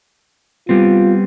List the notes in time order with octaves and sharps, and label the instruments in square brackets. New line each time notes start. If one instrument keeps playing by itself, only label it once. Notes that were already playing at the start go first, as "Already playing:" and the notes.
[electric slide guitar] G3 B3 C4 [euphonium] F4